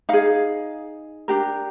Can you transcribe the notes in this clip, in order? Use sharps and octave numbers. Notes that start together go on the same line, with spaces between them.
D#4 G#4 F5
D4 G4 A#4